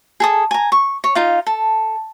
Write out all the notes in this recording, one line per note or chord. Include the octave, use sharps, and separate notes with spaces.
G#4 A4 D#6
G#5 A#5
C#6
C#5
D#4 F4 F5
A4